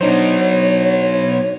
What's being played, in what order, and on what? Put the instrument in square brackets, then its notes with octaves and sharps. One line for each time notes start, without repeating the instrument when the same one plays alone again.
[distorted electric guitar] B2 F#3 [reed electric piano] D4 D#4 C5 [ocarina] C#5